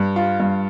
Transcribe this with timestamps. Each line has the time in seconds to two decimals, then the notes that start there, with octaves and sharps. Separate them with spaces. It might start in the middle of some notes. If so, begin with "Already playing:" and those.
Already playing: G2
0.16 F4
0.40 G2